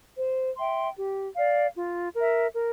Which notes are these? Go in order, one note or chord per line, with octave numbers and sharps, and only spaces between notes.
C5
E5 G5 C6
G4
D5 F5
F4
A#4 E5
A#4